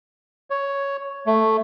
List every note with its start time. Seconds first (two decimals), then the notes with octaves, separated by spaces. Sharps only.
0.50 C#5
1.26 A3